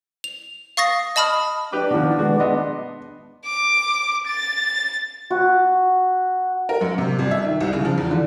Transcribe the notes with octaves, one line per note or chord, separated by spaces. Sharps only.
F7
F5 C#6 D#6 A6 A#6 C7
D#5 A5 B5 D#6 F6
D4 G4 B4 D6
B2 D#3 F3 F#4
D#3 G#3 F#4 B4
B3 D#5 C6
D6
A6
F#4
A#4
F#2
C3
G1
E5
D#3
C2
C#3
F3
E2
D3